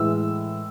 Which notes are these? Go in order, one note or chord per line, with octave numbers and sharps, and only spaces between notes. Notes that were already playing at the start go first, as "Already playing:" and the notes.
Already playing: A2 E3 G#3 E6